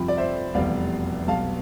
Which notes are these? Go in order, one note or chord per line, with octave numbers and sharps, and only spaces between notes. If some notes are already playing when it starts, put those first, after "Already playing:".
Already playing: G1 F2 C3 F3 G5 B5
D5
C5 E5
F1 E2 B2 G3 D5 F5
B1 B2 G3 F5 A5